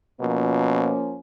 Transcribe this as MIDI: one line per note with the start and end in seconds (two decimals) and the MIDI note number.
0.21 0.93 47
0.21 1.18 53
0.21 1.18 58
0.21 1.18 61